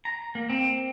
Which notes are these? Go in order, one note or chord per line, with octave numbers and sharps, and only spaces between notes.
A#5
A#3
C4